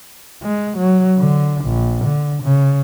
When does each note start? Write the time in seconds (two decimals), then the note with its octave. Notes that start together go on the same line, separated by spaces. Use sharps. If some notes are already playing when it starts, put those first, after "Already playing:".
0.43 G#3
0.77 F#3
1.18 D3
1.65 A#1
2.04 D3
2.43 C#3